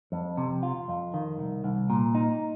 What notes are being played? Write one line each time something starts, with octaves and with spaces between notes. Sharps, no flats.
F2
C3
F4
F2
D#3
C2
C2
A#2
D#4